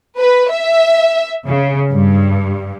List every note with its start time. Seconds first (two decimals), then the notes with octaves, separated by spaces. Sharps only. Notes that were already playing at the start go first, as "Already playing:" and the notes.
0.18 B4
0.51 E5
1.48 C#3
1.93 G2